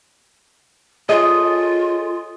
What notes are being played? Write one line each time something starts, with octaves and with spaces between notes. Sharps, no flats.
F4 G#4 A4 C#5 D#5